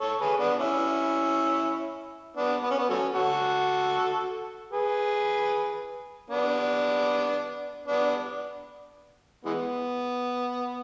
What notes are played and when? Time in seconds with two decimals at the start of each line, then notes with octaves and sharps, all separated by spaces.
0.01 A4 C#5
0.21 G#4 B4
0.40 B3 D4
0.60 C#4 E4
2.37 B3 D4
2.64 B3
2.71 C#4
2.78 B3
2.89 F#3 A3 C#4
3.15 F#4 A4
4.73 G#4 B4
6.30 B3 D4
7.88 B3 D4
9.45 E3 G#3 B3